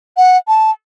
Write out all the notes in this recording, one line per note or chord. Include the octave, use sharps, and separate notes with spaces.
F#5
A5